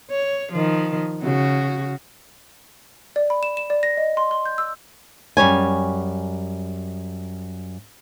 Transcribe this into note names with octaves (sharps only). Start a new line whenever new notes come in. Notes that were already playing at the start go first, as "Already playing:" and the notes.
C#5
D#3 F3
C#3 F#4
D5
B5
E7
E7
D5
A#6
D#5
C6
C6
G6
E6
F#2 G3 C#5 G#5